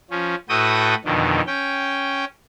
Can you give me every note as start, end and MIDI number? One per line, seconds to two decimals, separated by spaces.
0.10 0.35 53
0.10 0.35 61
0.49 0.95 45
0.49 0.95 66
0.49 0.95 69
0.49 0.95 71
0.49 0.95 79
0.49 0.95 87
1.04 1.41 41
1.04 1.41 47
1.04 1.41 50
1.04 1.41 51
1.46 2.25 61
1.46 2.25 79